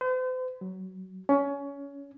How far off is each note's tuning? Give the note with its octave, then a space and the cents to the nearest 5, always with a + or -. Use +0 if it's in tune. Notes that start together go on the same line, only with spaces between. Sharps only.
C5 -45
F#3 +20
C#4 +20